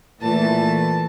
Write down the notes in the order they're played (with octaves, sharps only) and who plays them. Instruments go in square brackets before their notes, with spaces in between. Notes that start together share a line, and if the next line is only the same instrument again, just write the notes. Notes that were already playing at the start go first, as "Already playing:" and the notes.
[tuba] A#2 [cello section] E3 A3 [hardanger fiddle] A5